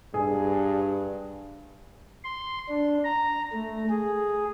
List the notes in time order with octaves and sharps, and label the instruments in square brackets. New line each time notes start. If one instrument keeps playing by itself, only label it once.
[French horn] G2 [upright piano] G#4
[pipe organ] C6
D4
A#5
A3
G#4